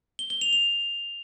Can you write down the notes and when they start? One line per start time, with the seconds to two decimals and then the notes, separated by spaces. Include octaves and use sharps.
0.19 G7
0.30 G7
0.41 F7
0.53 F7